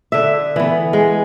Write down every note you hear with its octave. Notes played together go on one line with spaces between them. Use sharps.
D3 E5
E3 B3
G#3